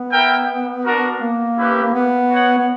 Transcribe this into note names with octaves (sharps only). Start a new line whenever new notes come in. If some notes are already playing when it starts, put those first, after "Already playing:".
Already playing: B3
E4 A#4 E5 G5
D4 F#4 A#4
A#3
C#4 E4 G4 B4
A#3
B3
F#4 C#5 F#5
B3